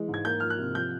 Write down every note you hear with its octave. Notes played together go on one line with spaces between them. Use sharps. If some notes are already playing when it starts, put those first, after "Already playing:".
Already playing: E3 G#3
G#2
G#6
A#3 G6
F3 F6
F#6
C3
F3 G6